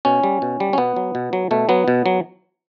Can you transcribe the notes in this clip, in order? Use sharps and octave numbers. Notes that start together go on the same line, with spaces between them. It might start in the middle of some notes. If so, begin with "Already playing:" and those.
B2 C#4
G3
B2
G3
C#4
B2 B3
F#3
B2
F#3
B2 A3
F#3 B3
B2
F#3